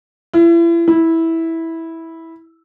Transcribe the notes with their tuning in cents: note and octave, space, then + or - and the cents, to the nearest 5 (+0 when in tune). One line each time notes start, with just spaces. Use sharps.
E4 +35
E4 -10